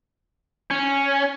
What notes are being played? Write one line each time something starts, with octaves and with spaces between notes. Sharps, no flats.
C#4